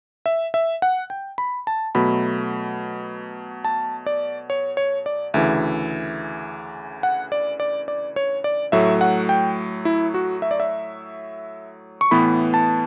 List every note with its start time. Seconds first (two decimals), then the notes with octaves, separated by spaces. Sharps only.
0.26 E5
0.54 E5
0.82 F#5
1.10 G5
1.38 B5
1.67 A5
1.95 B2 F#3 A3 B5
3.65 A5
4.06 D5
4.50 C#5
4.77 C#5
5.06 D5
5.34 D2 C#3 E3 E5
7.03 F#5
7.32 D5
7.60 D5
7.88 D5
8.16 C#5
8.44 D5
8.72 A2 F#3 A3 E5
9.01 F#5
9.29 G5
9.85 E4
10.14 F#4
10.42 E5
10.51 D5
10.60 E5
12.01 C#6
12.11 A2 E3 B3 B5
12.54 A5